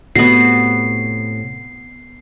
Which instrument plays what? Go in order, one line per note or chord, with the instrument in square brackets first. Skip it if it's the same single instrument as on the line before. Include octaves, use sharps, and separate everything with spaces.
[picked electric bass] A2 C3 [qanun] B3 F#4 [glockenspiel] C7